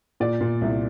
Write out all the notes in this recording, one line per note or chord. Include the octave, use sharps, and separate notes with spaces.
A#2 D5
A#2
C2